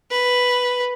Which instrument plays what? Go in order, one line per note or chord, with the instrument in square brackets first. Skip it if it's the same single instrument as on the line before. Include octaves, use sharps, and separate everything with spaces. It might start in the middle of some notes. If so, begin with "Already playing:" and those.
[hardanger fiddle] B4